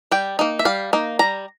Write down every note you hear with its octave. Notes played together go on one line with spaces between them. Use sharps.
G3 G5
A#3 D#4
E5
G3 F5
A#3 D#4
G3 A#5